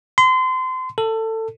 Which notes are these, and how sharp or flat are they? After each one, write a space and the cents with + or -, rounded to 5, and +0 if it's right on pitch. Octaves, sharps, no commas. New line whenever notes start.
C6 -30
A4 +20